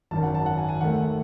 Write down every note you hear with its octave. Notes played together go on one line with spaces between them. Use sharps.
G#1 F#2 D#3 A5
F#5
A5
F#5
G#5
G#5
D#2 D#3 A3 F#5